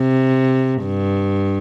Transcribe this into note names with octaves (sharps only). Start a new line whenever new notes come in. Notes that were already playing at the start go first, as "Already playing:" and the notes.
Already playing: C3
G2